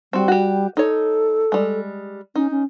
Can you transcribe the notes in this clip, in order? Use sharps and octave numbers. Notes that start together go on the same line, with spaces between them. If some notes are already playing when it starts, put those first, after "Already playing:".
G3 C4 F#4
F#4 G4
D#4 A4 C#5
G3 G#3
C#4 D#4
C#4